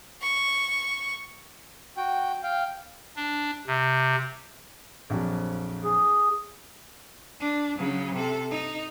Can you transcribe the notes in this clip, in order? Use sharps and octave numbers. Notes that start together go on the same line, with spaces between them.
C#6
F#4 G5
F5 G5
D4
C3
A#1 F2 F#3
G#4
D4
C#3 F#3
C3 A4
D#4